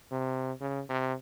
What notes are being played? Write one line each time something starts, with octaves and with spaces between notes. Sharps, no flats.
C3
C#3
C3